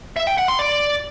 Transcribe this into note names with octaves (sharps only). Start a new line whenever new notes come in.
E5
G5
F#5
C6
D5